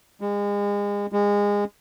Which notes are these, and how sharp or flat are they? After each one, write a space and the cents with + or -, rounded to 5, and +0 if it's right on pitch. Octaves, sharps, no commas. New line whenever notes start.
G#3 -35
G#3 -25